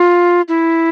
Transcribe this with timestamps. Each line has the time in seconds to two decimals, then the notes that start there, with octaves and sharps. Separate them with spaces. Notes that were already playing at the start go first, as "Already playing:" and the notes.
Already playing: F4
0.48 E4